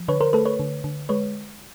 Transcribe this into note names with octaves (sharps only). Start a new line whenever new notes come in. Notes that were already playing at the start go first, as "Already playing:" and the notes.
Already playing: F3
D3 B4 C#5
A#4 C5
A3 A4 B4
B4 C#5
D3
D3
G#3 B4 C#5